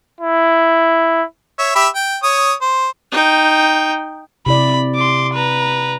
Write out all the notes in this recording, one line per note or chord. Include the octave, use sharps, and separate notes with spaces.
E4
C#5 E5
G4 E5 B5
G5
C#5 D#6
C5
D#4 G5
C3 E4 D5 B5
C6 D6
B4 A#5